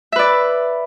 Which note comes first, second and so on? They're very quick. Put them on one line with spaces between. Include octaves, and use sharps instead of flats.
E5 B4 D5